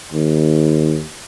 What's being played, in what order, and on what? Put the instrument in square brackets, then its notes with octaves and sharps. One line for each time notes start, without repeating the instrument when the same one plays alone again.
[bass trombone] D#2